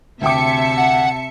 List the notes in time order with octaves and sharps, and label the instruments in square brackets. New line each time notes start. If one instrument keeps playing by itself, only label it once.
[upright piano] D2 G5 D6 [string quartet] C3 A5 [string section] E5 C#7
[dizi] F#5